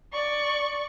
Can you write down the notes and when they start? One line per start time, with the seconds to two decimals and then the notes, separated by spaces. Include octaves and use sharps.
0.13 D5 C#6